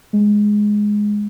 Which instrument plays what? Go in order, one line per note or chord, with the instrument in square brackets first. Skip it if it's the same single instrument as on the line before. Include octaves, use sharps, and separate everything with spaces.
[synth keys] G#3